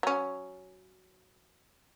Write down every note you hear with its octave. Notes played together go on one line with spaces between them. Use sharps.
F#3 C#4